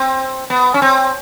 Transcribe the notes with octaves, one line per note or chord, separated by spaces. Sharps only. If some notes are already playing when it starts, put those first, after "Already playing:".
Already playing: C4
B3
C#4
C4